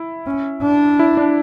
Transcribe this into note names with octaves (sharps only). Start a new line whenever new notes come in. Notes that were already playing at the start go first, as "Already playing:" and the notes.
Already playing: E4
C#4
D4
E4
D4